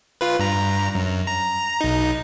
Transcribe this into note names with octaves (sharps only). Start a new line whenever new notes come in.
F4 B4
G2 A#5
F#2
A#5
B1 D#4